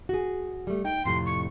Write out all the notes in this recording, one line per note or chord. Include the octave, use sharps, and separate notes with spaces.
F#4 G#4
G3 A3
D#4 G5
F2 A2 C3 C6
C#6